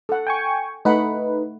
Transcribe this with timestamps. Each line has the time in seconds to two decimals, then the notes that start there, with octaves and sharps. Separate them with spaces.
0.09 A4 F#5
0.27 G5 G#5 C#6
0.85 A3 D#4 B4 F#5 B5